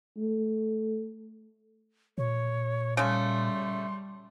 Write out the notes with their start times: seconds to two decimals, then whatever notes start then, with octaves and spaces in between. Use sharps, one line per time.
0.17 A3
2.18 A#2 C#5
2.97 C#3 G3 A3 C6